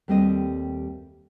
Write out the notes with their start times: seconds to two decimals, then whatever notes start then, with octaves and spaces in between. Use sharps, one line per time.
0.08 D#2 G3 A3 C4 F4 D#5